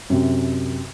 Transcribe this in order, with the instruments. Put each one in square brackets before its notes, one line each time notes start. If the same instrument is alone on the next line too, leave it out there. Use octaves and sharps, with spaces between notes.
[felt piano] F#2 C3